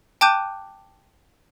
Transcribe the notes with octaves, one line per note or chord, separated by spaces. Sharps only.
G5 A5 D6 F#6 G6 D#7